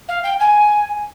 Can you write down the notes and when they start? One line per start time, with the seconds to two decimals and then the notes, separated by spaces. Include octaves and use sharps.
0.08 F5
0.24 G5
0.40 G#5